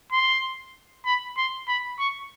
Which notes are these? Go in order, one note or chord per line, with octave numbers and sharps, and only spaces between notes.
C6
B5
C6
B5
C#6